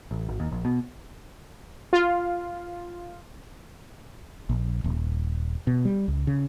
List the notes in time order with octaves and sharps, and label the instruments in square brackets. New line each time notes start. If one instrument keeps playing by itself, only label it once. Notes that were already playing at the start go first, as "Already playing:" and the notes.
[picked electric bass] A1
G#1
D#2
A#1
B2
[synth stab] F4
[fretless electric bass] A#1
D#1
B2
G3
C#2
C#3